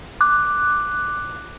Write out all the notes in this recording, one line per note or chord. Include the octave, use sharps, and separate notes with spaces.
D6 F#6